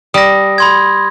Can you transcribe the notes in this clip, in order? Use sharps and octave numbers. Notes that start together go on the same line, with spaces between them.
G3 D#6 A#6
B5 C6 G#6